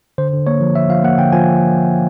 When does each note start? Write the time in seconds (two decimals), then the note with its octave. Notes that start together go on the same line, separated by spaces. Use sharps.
0.18 D3 C5
0.33 D3
0.47 A#3 C#5
0.61 F3
0.75 F3 E5
0.89 F3 F5
1.03 A#3 F#5
1.18 D3 G5
1.32 F3 G#5